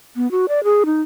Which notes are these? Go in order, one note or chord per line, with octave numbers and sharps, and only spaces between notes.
B3
F#4
D5
G#4
D#4